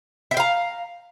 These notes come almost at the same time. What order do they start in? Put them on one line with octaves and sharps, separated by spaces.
E5 G5 F5 A#5